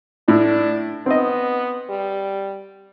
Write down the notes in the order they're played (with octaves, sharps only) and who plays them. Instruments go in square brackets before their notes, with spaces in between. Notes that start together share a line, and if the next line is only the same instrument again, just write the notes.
[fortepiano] A2 [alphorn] D4
[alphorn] B3 [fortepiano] C4 D#5
[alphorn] G3